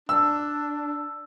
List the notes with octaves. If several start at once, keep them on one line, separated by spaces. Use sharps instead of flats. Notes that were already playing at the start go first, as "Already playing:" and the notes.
D4 E6